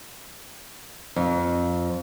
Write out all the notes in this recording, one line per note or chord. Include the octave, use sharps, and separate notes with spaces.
F2